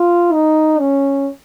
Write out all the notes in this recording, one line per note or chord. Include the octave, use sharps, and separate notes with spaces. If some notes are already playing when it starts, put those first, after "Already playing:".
Already playing: F4
D#4
C#4